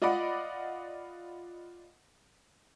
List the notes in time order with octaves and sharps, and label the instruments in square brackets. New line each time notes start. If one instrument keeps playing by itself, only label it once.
[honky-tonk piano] F4 D5 D#5 F#5 B5 D6